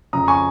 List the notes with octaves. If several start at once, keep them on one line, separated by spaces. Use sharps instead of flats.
F2 C#3 A#5 D#6
G#5 C#6